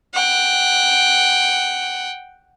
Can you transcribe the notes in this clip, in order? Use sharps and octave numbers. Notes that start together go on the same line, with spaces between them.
F#5 G5